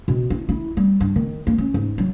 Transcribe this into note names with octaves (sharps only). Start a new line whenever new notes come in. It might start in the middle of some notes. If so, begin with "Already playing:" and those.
B2
E4
E4
G3
G2
D#3
A#3
C#4
G#2
F#3